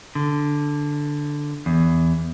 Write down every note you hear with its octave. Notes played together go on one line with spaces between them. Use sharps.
D3
E2